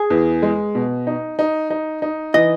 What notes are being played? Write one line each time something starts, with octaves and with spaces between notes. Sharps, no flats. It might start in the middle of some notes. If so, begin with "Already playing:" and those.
Already playing: G#4
E2
G#3
B2
D#4
D#4
D#4
D#4
E3 D#5